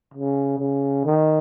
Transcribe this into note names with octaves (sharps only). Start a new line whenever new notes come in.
C#3
C#3
D#3